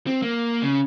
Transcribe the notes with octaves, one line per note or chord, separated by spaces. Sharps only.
C4
A#3
C#3